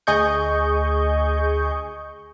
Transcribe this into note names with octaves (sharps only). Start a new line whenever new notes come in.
D2 G#4 D#5 C#6 G6